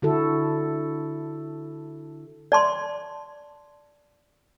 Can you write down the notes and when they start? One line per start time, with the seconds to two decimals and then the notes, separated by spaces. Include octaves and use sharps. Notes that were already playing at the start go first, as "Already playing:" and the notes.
0.02 D3 E4 F#4 A4
2.52 D5 A5 C6